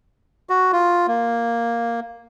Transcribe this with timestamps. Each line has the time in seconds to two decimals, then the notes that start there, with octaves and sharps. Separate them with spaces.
0.50 F#4
0.73 F4
1.08 A#3